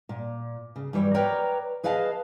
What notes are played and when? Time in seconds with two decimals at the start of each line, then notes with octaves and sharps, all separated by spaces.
0.09 A#2
0.76 C#3
0.93 G2 E3 G3 C#5
1.14 A#4 B4 C#5 D5 G5 A#5
1.84 G#4 B4 D#5 F5 F#5 A5